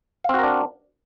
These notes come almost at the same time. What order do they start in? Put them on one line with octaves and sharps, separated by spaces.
F5 C4 F#4 A#4 D4